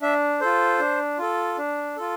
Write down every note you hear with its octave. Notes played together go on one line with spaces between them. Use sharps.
D4 E5
F4 A4 C5
D4
F4 A4
D4
F4 A4